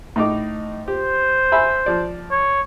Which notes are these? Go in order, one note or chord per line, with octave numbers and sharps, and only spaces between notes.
A2 D#4 D6
G4 C5
E5 G#5 B5
F3 D5
C#5